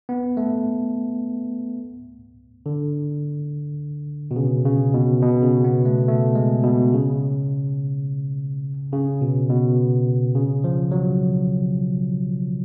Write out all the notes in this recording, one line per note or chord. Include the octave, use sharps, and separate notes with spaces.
B3
A3
D3
B2
C#3
C#3
B2
B2
C#3
B3
A3
A3
G#3
B2
C#3
C#3
B2
B2
C#3
F3
F#3